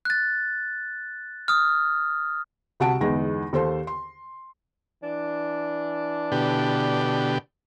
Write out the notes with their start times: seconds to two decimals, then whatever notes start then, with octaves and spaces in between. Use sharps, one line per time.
0.05 F#6 A6
1.48 D#6 F6
2.80 C2 F#4 F#5 A5 D7
3.00 G1 E2 G#3 D#4 G#4 A#6
3.53 D#2 A4 C5 C6
3.87 C6
5.03 E3 D4
6.32 B2 D3 G4